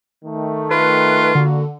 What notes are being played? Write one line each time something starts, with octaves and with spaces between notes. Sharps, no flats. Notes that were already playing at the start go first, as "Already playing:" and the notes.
D#3 A3
F4 B4
D3 A#3 F#4